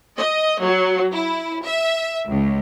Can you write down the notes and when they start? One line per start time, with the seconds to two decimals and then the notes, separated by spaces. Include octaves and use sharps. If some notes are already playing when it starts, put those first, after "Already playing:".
0.19 D#5
0.61 F#3
1.13 E4
1.65 E5
2.28 C#2